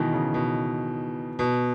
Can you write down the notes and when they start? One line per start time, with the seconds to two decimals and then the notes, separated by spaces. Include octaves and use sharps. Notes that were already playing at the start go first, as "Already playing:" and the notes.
Already playing: B2 D#3 E3
0.13 C#3
0.34 B2
1.39 B2